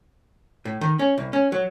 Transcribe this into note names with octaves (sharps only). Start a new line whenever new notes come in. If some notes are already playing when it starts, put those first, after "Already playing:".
A2
D#3
C#4
C2
C#4
F#3